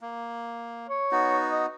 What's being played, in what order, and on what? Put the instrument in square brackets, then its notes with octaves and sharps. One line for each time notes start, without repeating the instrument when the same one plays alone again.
[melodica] A#3
[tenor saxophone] C#5
[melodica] B3 D#4 F#4
[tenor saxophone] D#5